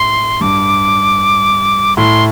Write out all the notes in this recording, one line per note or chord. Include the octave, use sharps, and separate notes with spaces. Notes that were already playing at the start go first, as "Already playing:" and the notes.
Already playing: A2 C6
G2 D6
A2 C6